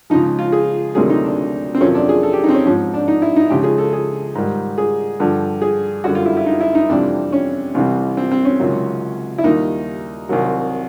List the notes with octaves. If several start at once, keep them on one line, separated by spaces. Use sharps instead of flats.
C#2 C#3 F3 D#4
F4
G#4
D2 C3 D#3 F#3 G#4
D#4
D4
C4
F2 C3 D#3 F#3 C#4
D4
G#4
A4
G4
D#4
C4
C#4
G#2 F3 C#4
D4
D#4
E4
D#4
C#2 C#3 F3 G4
G#4
A4
G#4
G#2 D#3 G3
G#4
G2 D3 F3
G#4
F#2 D3 G3 F#4
F4
E4
E4
D#4
E4
D#4
F2 C3 E3 G3 D4
C#4
C2 C3 E3 G3
C4
C4
C#4
C#2 C3 D#3 F#3
E4
D#2 D#3 G3 D#4
C2 C3 D#3 F#3